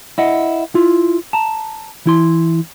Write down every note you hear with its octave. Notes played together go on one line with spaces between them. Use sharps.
E4 D#5 F#5
E4 F4
A5 A#5
E3 E4 C6